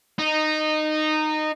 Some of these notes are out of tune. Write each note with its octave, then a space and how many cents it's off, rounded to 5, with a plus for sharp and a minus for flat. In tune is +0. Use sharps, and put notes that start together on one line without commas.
D#4 -15